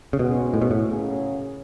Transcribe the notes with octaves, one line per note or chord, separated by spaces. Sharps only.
C#3
G#2 B2 G#3 C#4 F#4
A2
B2
A2
F#2 C#3 F#3 C#4 G#4